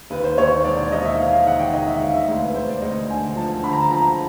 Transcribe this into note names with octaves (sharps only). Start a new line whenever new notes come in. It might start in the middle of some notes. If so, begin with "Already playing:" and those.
D#2 B4
C5
D#2 C#5
E1 D5
D5
D#2 D#5
E5
D#2 F5
F5
D#3 F#5
G5
D#3 D#5
E5
E1 F5
E5
D2 F5
B4
D2 C5
D5
D2 D#5
D3 G#5
F3 A5
D3 B5
A#5
A5
F3 A#5